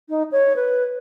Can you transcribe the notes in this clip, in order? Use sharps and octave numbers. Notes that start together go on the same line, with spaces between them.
D#4
C#5
B4